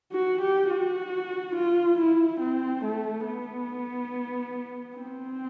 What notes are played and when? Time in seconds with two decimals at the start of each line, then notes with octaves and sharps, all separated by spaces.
0.12 F#4
0.41 G4
0.70 F#4
1.55 F4
1.98 E4
2.40 C4
2.84 A3
3.26 B3
4.97 C4